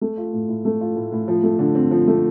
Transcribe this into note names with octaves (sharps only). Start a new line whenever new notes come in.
A3
F4
A2
A2
A3
F4
A2
A2
F3
A3
D3
C4
F3
A3